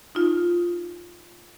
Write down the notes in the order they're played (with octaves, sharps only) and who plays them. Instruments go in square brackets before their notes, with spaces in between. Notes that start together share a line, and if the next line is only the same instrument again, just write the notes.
[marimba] D#4 F4